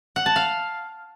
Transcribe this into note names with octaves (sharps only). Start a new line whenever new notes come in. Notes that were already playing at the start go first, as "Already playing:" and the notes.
F#5
A5
F5